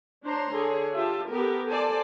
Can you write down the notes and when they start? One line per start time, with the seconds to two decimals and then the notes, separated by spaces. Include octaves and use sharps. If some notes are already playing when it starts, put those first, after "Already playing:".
0.24 D4 C5 C#5 A#5 C6
0.53 D3 G#4 C#5
0.95 F4 G4 E5 A5
1.29 B3 G4 A4 A#4
1.68 A4 C5 D5 G#5 A5